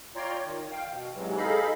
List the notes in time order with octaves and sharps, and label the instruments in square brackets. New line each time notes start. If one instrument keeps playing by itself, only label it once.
[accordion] F4 C#5 D5 G5 A#5 C6
D#3
F5 G5
B2
G#2 C3 E3 F#3 G#3
D#4 G#4 A4 D#5 F5 B5